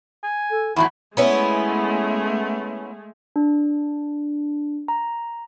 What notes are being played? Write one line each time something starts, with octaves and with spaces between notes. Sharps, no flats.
G#5
A4
E2 A2 F#3 E4 E5 B5
G#3 A3 B3 C#4 E4
D4
A#5